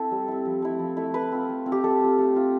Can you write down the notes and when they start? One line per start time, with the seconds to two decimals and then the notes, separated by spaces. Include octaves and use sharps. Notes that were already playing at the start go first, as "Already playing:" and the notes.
Already playing: C4 E4 A4
0.11 G3
0.28 C4 E4
0.45 F3
0.62 A3 E4
0.79 F3
0.97 A3 E4
1.14 A3 B4
1.32 C4 F4
1.49 A3
1.66 C4 F4
1.72 G4
1.84 A3 A4
2.00 C4 F4
2.18 A3
2.35 C4 F4